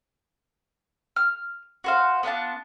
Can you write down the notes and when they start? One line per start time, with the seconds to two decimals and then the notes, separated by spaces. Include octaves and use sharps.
1.16 F6
1.84 F#4 C5 F5
2.23 B3 D4 F4 A5